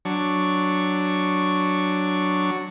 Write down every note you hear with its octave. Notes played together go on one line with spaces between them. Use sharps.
F#3 D4 C#6